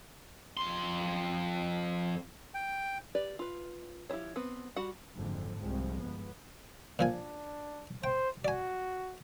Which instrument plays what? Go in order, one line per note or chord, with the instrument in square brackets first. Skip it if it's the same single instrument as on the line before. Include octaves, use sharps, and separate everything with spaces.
[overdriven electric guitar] F2 C6
[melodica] G5
[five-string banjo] G4 B4 D5
F4 B4
F3 E4 G4 C5 C#5
B3 C4
G3 F#4 F#5
[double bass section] F#1 F2 G#2 D3
C2 G#2 F3 G#3 C4
G1 B3
[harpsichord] A#2 F3 G#5 [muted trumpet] D4
[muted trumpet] C5 [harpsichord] G5
[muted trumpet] F#4 [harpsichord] D5 G#5